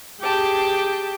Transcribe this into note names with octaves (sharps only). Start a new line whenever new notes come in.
G4 G#4 G5 A5 D6